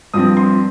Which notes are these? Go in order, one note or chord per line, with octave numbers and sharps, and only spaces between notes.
G2 F3 C4 D#6
C6